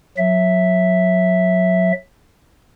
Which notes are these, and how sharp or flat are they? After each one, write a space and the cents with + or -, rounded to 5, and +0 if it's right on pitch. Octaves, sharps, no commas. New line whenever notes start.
F#3 -25 E5 +0